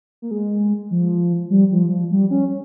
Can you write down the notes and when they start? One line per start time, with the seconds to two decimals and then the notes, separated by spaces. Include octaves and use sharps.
0.22 A#3
0.31 G#3
0.91 F3
1.50 G3
1.71 F3
1.90 F3
2.11 G3
2.30 C#4